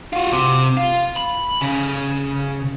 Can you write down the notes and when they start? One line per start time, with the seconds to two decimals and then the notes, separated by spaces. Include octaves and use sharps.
0.13 F4 F#4
0.32 C3
0.77 F4
1.16 B5
1.61 C#3